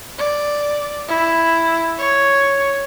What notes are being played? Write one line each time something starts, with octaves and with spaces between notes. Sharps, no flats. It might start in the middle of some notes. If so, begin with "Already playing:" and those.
D5
E4
C#5